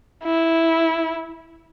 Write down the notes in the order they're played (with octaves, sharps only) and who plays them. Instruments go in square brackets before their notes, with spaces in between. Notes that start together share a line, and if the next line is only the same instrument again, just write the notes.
[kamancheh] E4